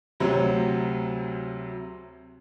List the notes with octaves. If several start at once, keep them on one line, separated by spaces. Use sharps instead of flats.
D2 C3 F#3